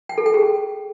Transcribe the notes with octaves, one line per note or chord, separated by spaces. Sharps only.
G5
A4
G5
G#4